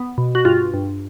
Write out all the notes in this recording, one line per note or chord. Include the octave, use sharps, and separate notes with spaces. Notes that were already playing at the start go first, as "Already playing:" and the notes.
Already playing: B3
B2
F#4
G2 F4
G2